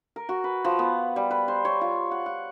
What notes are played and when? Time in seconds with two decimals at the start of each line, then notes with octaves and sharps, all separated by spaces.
0.16 A#4
0.29 F#4
0.44 B4
0.65 F3
0.79 B3
1.16 G3
1.31 B4
1.48 C5
1.65 C#5
1.81 F4
2.11 F#5
2.26 F#5